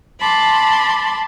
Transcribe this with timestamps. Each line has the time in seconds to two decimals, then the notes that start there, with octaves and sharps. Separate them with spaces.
0.20 A5 B5 C6 D6